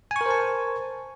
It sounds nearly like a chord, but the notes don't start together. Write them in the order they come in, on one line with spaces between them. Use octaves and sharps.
G#5 C#6 A#4 C5 A5